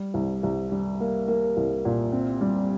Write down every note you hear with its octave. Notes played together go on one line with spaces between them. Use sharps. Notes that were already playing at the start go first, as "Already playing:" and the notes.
Already playing: G3
C2
C2
G3
A#3
A#3
C2
A#2
C4
G3